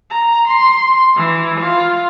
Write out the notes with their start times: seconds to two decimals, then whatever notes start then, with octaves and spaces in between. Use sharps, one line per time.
0.11 A#5
0.48 C6
1.16 E3
1.60 F4